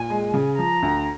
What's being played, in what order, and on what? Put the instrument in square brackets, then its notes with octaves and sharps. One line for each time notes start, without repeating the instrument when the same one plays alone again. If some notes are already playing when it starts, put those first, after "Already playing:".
Already playing: [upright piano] A#2 [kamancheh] G#5
[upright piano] G#3
C#3
[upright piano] F3 [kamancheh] A#5
[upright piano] D2